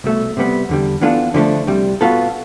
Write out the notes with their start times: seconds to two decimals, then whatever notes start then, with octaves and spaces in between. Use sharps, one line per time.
0.04 C2 B2 A3
0.37 C3 G3 B3
0.69 E2 D3 G3
1.01 E3 B3 D4 F4 A4
1.34 D3 F3 A3 D4
1.67 C2 C3 G3
2.01 B2 B3 F4 A4